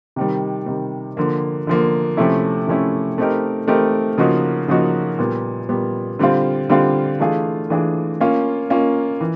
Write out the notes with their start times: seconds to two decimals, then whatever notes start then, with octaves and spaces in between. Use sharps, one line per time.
0.16 C3 D#3 G3
0.66 C3 D#3 G3
1.17 D3 F3 A#3
1.67 D3 F3 A#3
2.17 C3 F3 A3 C#4 E4
2.67 C3 F3 A3 C#4 E4
3.18 A3 C4 D#4 G4 A#4
3.68 A3 C4 D#4 G4 A#4
4.18 C#3 F3 A#3 D#4 F#4
4.68 C#3 F3 A#3 D#4 F#4
5.19 A#2 G3 B3
5.69 A#2 G3 B3
6.19 D3 G3 C4 F4
6.70 D3 G3 C4 F4
7.20 E3 A3 D4 F4 G#4
7.70 E3 A3 D4 F4 G#4
8.20 A#3 C#4 F4
8.70 A#3 C#4 F4
9.21 E3